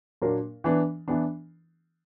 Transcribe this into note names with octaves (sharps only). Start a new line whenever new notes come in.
A#2 F#3 A#3 D4 A#4
E3 B3 D4
E3 B3 D4